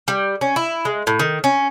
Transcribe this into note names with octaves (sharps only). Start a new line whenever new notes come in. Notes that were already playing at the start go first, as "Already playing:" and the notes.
G3
C#4
E4
G#3
A2
D#3
C#4